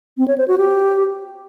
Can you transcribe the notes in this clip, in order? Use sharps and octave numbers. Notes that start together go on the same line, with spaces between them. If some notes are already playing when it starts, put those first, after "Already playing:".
C4
C#5
C5
F#4
G4